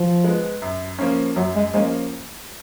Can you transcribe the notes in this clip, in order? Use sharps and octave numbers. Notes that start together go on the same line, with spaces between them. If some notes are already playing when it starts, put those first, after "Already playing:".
Already playing: F3
G#3 B3
F#2
F3 A#3 C#4
F#2 F#3
G#3
F3 G#3 A#3 C#4